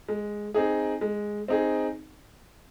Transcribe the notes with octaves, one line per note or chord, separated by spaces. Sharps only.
G#3
C4 D#4 G#4
G#3
C4 D#4 G#4